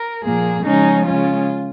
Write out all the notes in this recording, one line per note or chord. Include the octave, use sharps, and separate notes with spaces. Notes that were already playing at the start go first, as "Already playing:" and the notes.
Already playing: A#4
A#2 F3 A#3 G#4
C#3 F3 G#3 C#4 D#4
C#3 G#3 C#4 F4